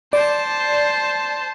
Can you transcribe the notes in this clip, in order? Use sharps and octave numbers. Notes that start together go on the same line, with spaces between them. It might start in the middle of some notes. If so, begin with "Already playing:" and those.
C5 D5 A5